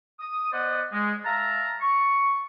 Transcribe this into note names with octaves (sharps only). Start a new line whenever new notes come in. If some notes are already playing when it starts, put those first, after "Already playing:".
D#6
B3 C5 D5 D#5 F#5
G#3
E5 F5 A5 A#5
C#6